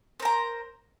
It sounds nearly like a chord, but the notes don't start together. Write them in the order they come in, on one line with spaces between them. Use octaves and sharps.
C5 A#4 A#5